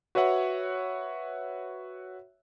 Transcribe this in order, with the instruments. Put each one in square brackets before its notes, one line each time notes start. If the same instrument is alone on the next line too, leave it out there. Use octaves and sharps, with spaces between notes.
[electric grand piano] F#4 B4 C#5 E5 F#5